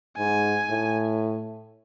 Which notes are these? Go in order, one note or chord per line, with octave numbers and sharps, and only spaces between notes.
G#2 G#5
A2